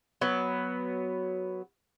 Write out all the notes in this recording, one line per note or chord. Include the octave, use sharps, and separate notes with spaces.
F#3 B3